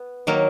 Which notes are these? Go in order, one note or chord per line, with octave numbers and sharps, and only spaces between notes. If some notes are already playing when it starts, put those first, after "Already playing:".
Already playing: B3
D#3 F#3 A#3